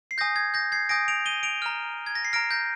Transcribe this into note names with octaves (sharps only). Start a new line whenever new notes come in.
C7
G#5 D#6 G6 A#6
G#6
G6 A#6
G#6 C7
G#5 D#6 G6 A#6 D7
D7 F7
D#7 G7
D7 F7
A#5 F6
G#6
A#6
C7
A#5 F6 A#6 D7
G6 A#6